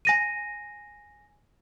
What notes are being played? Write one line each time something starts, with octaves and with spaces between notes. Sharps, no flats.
G#5 A#6 D#7